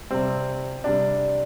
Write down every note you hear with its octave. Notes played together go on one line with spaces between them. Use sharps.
C3 G3 C4
C3 G3 D4